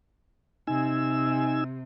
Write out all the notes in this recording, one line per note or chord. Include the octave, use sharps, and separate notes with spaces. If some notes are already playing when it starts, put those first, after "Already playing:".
C3 D#4 G#5 E6